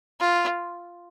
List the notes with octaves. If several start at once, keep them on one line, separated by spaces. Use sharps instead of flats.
F4